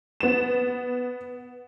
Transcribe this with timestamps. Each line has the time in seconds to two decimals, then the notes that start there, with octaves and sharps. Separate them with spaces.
0.21 B3 E7